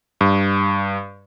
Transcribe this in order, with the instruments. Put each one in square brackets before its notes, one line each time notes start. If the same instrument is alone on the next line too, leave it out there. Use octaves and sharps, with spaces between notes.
[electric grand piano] G2